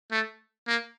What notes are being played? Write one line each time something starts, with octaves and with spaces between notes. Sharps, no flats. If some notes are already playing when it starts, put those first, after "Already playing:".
A3
A#3